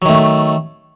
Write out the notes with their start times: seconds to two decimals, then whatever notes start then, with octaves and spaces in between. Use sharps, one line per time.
0.02 F#3
0.05 D#3
0.09 A3